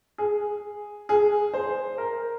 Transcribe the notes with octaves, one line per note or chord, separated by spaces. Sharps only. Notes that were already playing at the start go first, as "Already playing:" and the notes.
G#4
G#4
C5
A#4